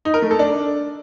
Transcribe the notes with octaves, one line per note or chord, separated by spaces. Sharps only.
D#4
A#4
A3
A4
D4